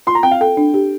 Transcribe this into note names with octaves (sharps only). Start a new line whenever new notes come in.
F4 C6
A#5
C4 G5
F5
A4 G5
D4
G4